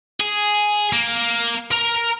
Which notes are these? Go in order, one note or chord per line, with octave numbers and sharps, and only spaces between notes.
G#4
A#3
A#4 A#5